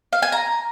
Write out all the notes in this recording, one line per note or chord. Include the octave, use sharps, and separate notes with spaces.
F5
G#5
A#5